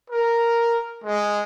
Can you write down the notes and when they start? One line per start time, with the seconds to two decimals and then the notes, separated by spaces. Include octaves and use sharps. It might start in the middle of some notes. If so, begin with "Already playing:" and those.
0.10 A#4
1.04 G#3